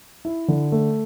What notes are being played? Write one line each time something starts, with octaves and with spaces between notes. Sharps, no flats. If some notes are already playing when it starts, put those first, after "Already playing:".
E4
D3
A3